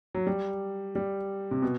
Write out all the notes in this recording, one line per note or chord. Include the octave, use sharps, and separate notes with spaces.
F#3
G3
G3
C3
B2